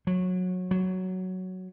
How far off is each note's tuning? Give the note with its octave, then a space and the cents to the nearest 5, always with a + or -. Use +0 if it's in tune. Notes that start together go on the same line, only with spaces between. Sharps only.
F#3 -20
F#3 +5